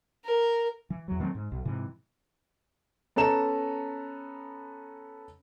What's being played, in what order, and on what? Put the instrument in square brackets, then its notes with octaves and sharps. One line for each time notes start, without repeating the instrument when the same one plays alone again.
[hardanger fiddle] A#4
[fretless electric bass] E3
E2 F#3
D#3 F#3 A3 C4
G#2
B1
G#2 C3 E3
[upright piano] B3 C#4 A4 A#5 E7